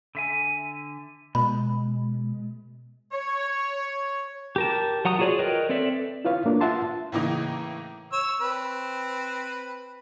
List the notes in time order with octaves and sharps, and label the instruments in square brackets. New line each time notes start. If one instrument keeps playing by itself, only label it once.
[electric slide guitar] D3 E5 G#5
[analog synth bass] B2 [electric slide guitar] G#3 [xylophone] B5
[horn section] C#5
[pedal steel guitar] G4 A#4 A5
F#3 F#5 A#5 D#6
F4 F#4 G#4 C#5 D5
A#4 B4 C#5 D#5 G5
C4 A4 D5 E5
[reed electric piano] E4 F4 B4 C#5 F5
A#3 D4 F4
F4 E5 F#5 A5 C6
[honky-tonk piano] A2 C#3 E3 A#3 D#4 D6
[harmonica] C#5 E6
C4 B4